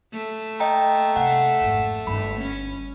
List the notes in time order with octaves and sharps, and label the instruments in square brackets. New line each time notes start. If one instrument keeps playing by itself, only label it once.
[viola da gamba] A3
[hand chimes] D#5 G5 A#5
[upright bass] C3 [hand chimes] F#5
[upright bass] G#1 F2
[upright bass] G1 D3 [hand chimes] B5
[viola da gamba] C#4